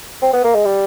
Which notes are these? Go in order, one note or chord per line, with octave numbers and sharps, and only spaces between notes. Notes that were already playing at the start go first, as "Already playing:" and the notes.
C4
B3
A#3
G#3
G3